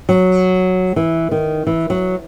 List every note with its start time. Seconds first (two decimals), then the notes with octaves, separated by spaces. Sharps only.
0.09 F#3
0.96 E3
1.31 D#3
1.67 E3
1.90 F#3